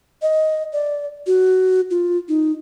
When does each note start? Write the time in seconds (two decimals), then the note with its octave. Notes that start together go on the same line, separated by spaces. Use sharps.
0.22 D#5
0.73 D5
1.27 F#4
1.91 F4
2.28 D#4